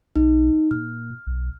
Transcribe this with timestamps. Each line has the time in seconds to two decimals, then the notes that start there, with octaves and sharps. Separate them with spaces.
0.16 B1 D#4
0.71 A#2 F6
1.27 B1